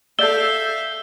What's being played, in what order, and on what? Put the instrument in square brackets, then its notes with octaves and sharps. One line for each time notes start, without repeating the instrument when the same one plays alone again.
[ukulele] A4 D5 [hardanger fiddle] E5 F5 [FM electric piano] E6 G6 [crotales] G7